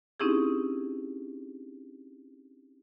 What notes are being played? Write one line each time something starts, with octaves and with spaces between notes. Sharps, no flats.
C4 C#4 D#4 E4 G4 G#4